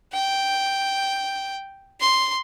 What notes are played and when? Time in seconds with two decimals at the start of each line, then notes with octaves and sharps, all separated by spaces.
0.13 G5
2.00 C6